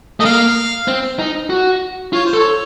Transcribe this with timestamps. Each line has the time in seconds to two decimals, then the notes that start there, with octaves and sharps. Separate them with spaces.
0.20 A3 D#5
0.25 A#3 F5
0.88 C4
1.19 D#4
1.50 F#4
2.13 F4 C#5
2.26 C5
2.34 A4
2.38 C#5